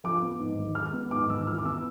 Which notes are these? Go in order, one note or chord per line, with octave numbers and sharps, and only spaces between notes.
F3 D6
B3
G#2
G#1
G#3 F6
B3
G#2 D6
G#1 E6
E3 F6
D6
B3 E6